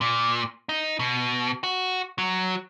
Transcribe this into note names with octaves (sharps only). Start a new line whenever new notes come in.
A#2
D#4
B2
F#4
F#3